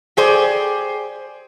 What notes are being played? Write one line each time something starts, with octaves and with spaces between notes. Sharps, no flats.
G4 G#4 C5 D5